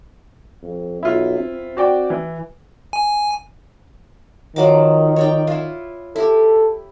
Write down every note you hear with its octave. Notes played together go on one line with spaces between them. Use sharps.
F2
B1 E4 F4
C4
F#4 D5 G5
E3
G#5
D#3 F3 F#3 D6
C#5 D5 G5
E4 F4
E4 G4 A4